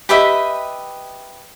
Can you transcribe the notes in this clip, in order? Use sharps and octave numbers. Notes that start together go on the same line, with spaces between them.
G4 B4 D#5 E5